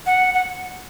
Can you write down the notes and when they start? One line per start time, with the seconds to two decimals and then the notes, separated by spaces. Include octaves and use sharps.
0.06 F#5
0.34 F#5